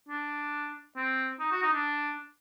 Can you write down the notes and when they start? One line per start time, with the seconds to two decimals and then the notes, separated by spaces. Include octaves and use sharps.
0.09 D4
0.97 C4
1.40 D#4
1.52 F#4
1.62 D#4
1.73 D4